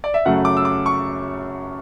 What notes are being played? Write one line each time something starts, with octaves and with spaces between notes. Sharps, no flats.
D5
E5
F#2 C#3 F#3 A3 F#5
D6
E6
D6
C#6